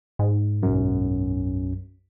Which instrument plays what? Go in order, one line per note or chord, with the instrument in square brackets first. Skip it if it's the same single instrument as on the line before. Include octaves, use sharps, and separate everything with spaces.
[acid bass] G#2
[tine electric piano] B1 F#2